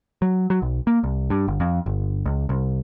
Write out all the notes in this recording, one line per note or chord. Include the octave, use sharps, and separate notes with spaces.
F#3
F#3
B1
A#3
C2
G2
G1
F2
G1
C#2
C2